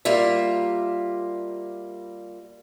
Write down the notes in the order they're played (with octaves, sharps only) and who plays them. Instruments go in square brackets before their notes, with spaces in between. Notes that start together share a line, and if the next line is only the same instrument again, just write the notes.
[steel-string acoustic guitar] G3 A#3 F4 E5